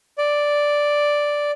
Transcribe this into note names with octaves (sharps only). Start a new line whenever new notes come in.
D5